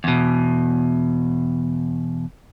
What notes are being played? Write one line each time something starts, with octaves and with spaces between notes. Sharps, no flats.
E2 B2